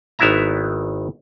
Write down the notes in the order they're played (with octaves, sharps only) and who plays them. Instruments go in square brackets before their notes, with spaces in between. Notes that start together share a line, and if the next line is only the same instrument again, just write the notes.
[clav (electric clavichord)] G#1 D#3 B3 E4 E5 A#5